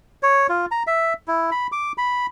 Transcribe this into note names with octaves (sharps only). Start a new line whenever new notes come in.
C#5
F4
A#5
E5
E4
B5
D6
B5